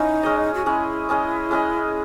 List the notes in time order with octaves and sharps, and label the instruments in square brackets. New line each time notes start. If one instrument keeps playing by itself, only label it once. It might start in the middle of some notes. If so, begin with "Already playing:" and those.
Already playing: [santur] C#4 E4 [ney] D#4
[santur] G#3 C#4 G#4 D#5
[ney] F#4
[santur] G#3 C#4 G#4 D#5 [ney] E4
[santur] G#3 C#4 G#4 D#5
G#3 C#4 G#4 D#5